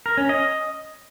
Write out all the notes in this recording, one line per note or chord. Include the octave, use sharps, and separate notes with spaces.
A#4
C#4
D#5